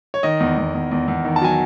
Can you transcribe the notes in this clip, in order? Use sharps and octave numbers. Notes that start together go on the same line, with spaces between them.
C#5
D#3 D#5
E2
E2
E2
E2
E2
D#3
A5
F#3 G#5